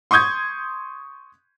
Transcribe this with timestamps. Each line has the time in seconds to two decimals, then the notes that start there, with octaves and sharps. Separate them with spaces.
0.11 C6 C#6 D#6 G6 G#6